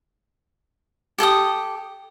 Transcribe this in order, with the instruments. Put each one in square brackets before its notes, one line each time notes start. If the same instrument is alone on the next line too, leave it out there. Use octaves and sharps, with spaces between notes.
[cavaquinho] G4 A4 G5 D#6